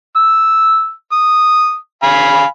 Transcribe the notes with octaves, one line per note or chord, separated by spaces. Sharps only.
E6
D#6
F5 G#5 B5